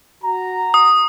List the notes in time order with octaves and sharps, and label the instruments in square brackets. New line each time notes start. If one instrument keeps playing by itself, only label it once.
[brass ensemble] F#4 A#5
[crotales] D#6